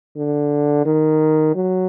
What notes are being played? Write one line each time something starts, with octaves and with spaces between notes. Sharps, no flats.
D3
D#3
F#3